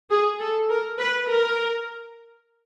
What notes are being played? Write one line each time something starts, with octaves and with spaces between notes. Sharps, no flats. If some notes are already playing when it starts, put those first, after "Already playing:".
G#4
A4
A#4
B4
A#4